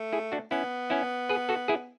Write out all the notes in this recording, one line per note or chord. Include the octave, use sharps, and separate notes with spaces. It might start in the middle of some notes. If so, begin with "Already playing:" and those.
Already playing: A3
E4 G#4
D4 F#4
B3 C#4 E4
C#4 E4
G#4 B4
F#4 A4
E4 G#4